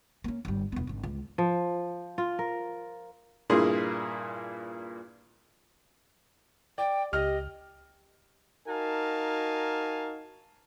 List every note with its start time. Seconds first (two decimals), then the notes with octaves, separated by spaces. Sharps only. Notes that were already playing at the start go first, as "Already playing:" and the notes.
0.24 A#3 C#4
0.45 G1 G3
0.72 E1 B3
0.87 G#1 D3
1.04 C#2
1.38 F3
2.18 F4
2.39 A#4
3.50 G2 A#2 A#3 E4 G#4 C6
6.78 D5 G5
7.13 C#2 G4 D#5 F6
8.67 D#4 F#4 A#4 F5 G#5 A5